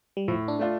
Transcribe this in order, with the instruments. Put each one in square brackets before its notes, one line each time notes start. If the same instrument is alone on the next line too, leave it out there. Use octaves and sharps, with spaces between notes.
[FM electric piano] G3
[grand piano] A2 [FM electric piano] F3
[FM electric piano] D4
[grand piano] A3 D4 F4